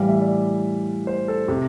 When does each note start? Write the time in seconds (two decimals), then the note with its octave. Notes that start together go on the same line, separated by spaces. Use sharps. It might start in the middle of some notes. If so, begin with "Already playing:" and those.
Already playing: A2 E3 G3 F5
0.08 E5
0.21 D5
1.07 C5
1.28 A4
1.48 C3